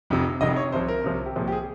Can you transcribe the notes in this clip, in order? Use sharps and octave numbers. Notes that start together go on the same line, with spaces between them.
F1 F2 C3
F1 F2 C3 D#5
C#5
C2 C3 F3 C5
A#4
C2 C3 F3
G4
C2 A#2 F3 G#4
G4
G#4